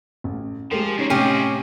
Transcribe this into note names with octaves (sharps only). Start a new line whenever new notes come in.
A1
F3 G#3 G4 A#4
F2 A#3 C#4 D#4
A2 C3 C#4 F4 G4 D#5